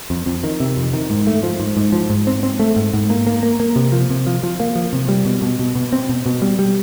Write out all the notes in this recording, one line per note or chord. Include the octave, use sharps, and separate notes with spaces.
F2
F2
D#3
C3
F2
D#3
G#2
A3
F3
G#2
G#2
F3
G#2
C4
C4
A3
G#2
G#2
A#3
A#3
A#3
A#3
C3
F3
C3
F3
F3
A#3
F3
C3
G3
B2
B2
B2
B2
C4
B2
B2
G3
G3